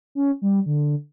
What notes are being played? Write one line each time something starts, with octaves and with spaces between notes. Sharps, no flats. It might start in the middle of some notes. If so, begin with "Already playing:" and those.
C#4
G3
D3